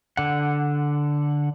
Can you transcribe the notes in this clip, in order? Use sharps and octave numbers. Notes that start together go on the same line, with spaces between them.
D3 F#5